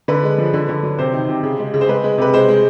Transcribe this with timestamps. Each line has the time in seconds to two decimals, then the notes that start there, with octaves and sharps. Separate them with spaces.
0.08 D3 B4
0.23 G#3
0.38 F3
0.54 D3
0.69 D3
0.83 F#3
0.98 C3 C5
1.13 D#3
1.29 C3
1.43 C#3
1.59 G#3
1.74 C#3
1.81 C5
1.89 G#3 B4
2.04 G#3
2.18 C3 B4
2.34 G#3 C5
2.48 G#3